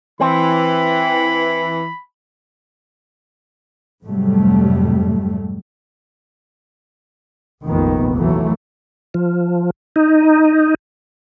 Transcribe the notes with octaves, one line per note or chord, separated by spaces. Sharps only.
E3 C4 B5
F2 G#2 C3 F#3 G3 A3
F1 A#1 F2 D#3 B3
D#2 E3 F#3 A3
F3
D#4